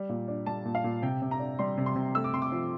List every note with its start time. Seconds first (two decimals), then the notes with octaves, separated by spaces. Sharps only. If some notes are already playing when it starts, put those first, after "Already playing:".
Already playing: G3
0.09 A#2
0.28 D4
0.46 G3 A5
0.65 A#2
0.75 F5
0.84 A#2
1.02 C3 G5
1.22 C3
1.31 A#5
1.39 D4
1.59 G3 C6
1.78 C3
1.86 C6
1.95 C3
2.15 A3 E6
2.24 D6
2.33 C3 C6
2.42 D6
2.51 F3